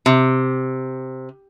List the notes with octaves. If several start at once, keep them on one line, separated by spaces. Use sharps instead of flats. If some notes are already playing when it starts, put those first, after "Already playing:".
C3